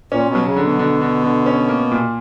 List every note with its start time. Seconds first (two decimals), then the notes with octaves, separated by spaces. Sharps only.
0.12 A#2 C#4
0.29 B2
0.35 F#3
0.46 C#3
0.56 D3
0.62 B2
0.79 D3
1.01 D3
1.24 D3
1.46 C#4
1.68 A#3
1.91 A#2